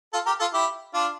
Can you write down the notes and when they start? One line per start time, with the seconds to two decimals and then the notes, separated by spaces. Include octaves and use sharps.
0.13 F4 A4
0.26 G4 A#4
0.40 F4 A4
0.53 E4 G4
0.94 D4 F4